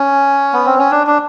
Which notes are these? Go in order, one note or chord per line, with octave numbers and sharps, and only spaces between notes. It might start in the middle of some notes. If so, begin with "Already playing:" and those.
Already playing: C#4
B3
C4
C#4
D4
D4